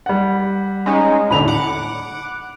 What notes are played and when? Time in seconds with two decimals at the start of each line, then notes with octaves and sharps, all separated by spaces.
0.06 G3 F#5
0.86 G#3 C#4 D#4
1.31 D#2 A2 D3 B5 F7
1.48 F#5 D6